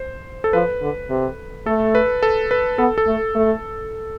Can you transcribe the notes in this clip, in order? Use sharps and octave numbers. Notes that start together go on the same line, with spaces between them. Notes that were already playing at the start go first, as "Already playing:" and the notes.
Already playing: C5
A4
F3 B4
D3
C3
A3 A4
B4
A4
B4
B3 A4
A4
A3
A3